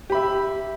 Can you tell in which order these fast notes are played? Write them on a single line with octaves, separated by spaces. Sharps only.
G4 B5 E5